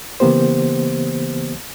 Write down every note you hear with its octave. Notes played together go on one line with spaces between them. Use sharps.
C#3 E3 A#3 B3 G4 C5